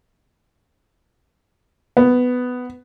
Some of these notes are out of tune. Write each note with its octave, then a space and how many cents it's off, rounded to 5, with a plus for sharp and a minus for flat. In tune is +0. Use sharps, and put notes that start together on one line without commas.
B3 +10